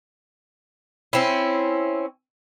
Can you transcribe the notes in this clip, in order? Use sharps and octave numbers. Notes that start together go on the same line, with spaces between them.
C4 C#4 E4